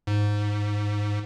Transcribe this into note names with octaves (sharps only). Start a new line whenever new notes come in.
G#2